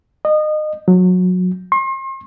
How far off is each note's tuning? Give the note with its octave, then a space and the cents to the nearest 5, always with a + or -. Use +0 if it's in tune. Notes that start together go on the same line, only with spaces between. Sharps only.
D#5 -25
F#3 -25
C6 +40